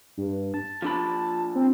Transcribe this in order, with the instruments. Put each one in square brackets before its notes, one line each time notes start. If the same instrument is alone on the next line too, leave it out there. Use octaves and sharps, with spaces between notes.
[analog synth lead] G2
A5
[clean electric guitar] F3 D4 B5
[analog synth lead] C4